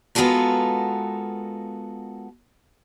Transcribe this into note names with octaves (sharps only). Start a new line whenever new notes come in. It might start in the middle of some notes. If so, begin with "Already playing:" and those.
G#3 B3 F4 F#4 A4 A#4